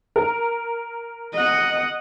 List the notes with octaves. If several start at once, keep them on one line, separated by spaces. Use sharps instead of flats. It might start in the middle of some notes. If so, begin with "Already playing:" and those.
A#4
D#5 F#5